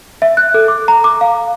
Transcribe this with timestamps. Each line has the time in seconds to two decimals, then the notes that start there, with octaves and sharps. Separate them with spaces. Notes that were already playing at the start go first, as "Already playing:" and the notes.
0.22 E5
0.37 F#6
0.54 A4
0.68 D6
0.88 A#5
1.04 D6
1.21 F5